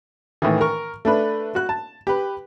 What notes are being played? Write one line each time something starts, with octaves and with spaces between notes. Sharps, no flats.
A2 D#3 E3
A#4 C#6
A3 D4 B4
F#4 F#6
A5
G4 B4